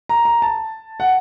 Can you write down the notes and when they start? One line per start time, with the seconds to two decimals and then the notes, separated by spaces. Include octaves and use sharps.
0.09 A#5
0.25 A#5
0.42 A5
1.00 F#5